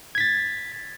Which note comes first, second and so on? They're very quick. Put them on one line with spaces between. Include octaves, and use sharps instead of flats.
G#6 B6 A6